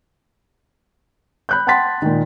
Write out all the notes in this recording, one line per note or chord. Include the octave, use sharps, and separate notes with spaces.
B5 F#6 G6
F#5 G5 A5 C6 A6 B6
A#2 D#3